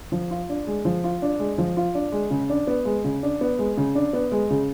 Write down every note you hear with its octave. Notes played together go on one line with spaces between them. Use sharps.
F3
F4
D4
G#3
F3
F4
D4
G#3
F3
F4
D4
G#3
C#3
D4
B3
G#3
C#3
D4
B3
G#3
C#3
D4
B3
G#3
C#3